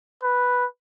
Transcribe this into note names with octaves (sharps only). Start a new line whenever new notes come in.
B4